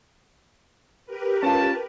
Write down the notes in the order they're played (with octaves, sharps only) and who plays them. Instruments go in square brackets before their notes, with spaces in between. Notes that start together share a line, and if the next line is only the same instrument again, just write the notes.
[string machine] G4 A#4 B4
[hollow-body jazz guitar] C#4 F4 [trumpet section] A5